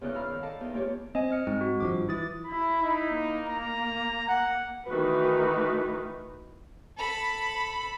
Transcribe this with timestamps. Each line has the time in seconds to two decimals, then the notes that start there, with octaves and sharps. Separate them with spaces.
0.01 E2 A#2 C#3 D#4 F#6
0.14 F5 A#5 B5 E6 F6
0.30 D#3
0.43 A4 D5 D#5 F5 A5
0.61 E2 D#4
0.74 A#3 F4 G4 C#5 D5
1.15 C4 D#5 G#5
1.31 D#5 F6 C#7
1.47 G#2 C4
1.61 F#4
1.80 G#1 G2 F3 D6
2.09 E3 E4 D#6 A6
2.47 E4 B5
2.82 D#4
3.13 A#3
3.49 A#5
4.29 F#5
4.88 D#3 E3 A3 D#4 F#4 B4
6.98 A4 B5